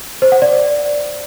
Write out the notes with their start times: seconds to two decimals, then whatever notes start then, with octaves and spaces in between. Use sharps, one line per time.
0.22 C5
0.32 F#5
0.42 D5